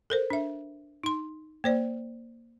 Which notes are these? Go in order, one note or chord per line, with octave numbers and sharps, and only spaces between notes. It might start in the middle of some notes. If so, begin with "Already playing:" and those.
A4 A#4 C5
D4 E5
D#4 C6
A#3 C5 D5